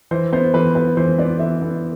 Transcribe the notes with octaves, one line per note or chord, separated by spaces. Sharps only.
E3 C5
B3 C5
E3 B4
B3 B4
E3 C5
B3 D5
E3 E5
B3